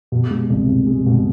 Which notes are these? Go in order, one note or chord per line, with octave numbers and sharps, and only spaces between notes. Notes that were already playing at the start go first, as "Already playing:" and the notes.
B2
G#3
C2
C2
G#3
B2